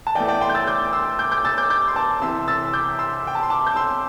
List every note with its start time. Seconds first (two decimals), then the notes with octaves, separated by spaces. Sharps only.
0.07 A5
0.15 E2 E3 A3 D5 G5
0.28 D5 G5
0.41 G5 C6
0.50 G6
0.54 E6 A6
0.67 D6 G6
0.84 D6
0.93 C6 E6
1.19 D6 G6
1.31 D6 G6
1.44 E6 A6
1.58 D6 G6
1.70 D6 G6
1.88 C6
1.96 A5 D6
2.22 C2 C3 E3 C6 E6
2.48 E6 A6
2.73 D6 G6
2.99 C6 E6
3.27 G5
3.35 A5
3.43 C6
3.50 A5 D6
3.67 G6
3.76 C6 E6